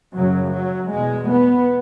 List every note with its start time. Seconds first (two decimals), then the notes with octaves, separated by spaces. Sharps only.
0.15 F#2 C#3 F#3
0.53 F#3
0.91 E2 B2 G#3
1.30 B3